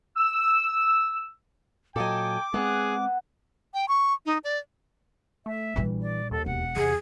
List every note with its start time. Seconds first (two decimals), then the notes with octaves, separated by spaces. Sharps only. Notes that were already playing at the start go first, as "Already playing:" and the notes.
0.17 E6
1.96 A#2 F#3 A4 D#5 G5 G#5 D6
2.54 G#3 A3 B3 C4 G#4 F#5 F#6
3.74 G5
3.88 C#6
4.26 D#4
4.44 D5
5.46 A3 E5
5.76 A#1 E3 G3
6.02 D5
6.31 D#2 A4
6.46 E1 F#5
6.77 E2 C3 G#4